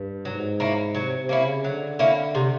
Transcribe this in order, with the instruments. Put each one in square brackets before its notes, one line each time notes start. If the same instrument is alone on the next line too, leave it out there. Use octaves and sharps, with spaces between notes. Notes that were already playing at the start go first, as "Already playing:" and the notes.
Already playing: [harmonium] G2
[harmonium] G#2 [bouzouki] F#3
[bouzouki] A#3 C#4 E4
[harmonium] C3 [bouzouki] F#3
[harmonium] C3
[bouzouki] A#3 C#4 E4
[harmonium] C#3
[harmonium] D3 [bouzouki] F#3
[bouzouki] A#3 C#4 E4
C3